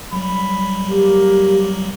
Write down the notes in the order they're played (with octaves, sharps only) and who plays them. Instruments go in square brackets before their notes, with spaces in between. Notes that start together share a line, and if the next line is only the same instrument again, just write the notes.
[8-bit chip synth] F#3 G3 [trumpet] B5
[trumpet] A#3 [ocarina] G4